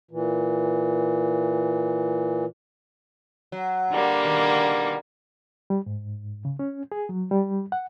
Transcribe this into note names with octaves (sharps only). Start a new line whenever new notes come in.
A#2 E3
F#3
D3 G3 A#3
B2 D#3
G3
G#2
C#3
C#4
G#4
F#3
G3
F#5